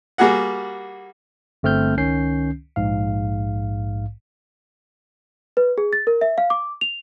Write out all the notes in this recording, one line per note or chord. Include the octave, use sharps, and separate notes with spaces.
G3 A#3 F#4 G#4 F#5
G1 A3 C4 F6 G6
C#2 D#3 C#4 G6 C7
A#1 G#2 F5
B4
G#4
A6
A#4
E5
F5
D6
F7